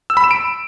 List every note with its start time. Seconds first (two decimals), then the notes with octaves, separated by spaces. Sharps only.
0.10 E6
0.17 B5
0.24 E7
0.31 D7